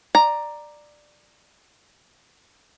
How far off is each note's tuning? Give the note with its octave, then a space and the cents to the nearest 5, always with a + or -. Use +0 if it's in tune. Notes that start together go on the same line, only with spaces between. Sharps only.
D5 +15 A#5 +0